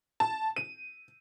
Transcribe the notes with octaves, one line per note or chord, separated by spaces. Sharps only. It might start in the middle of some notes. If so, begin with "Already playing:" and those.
A5
D#7